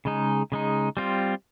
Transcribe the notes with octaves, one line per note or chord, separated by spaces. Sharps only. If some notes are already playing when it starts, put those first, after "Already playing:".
C#3 G#3 D#4
C#3 G#3 D#4
G3 C4 F4